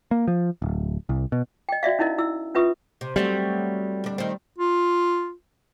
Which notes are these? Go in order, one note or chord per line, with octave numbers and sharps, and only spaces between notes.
A#3
F3
D1
C2
B2
D#5 G5
F#4 D5 E5 F5
C#4 D#4 E4 A#4 D#5
E4 E6
C#4 F4 B4 E5 C#6 D#6
C3
F#3 G3 A3 C4
D2 D4
D#3 C4
F4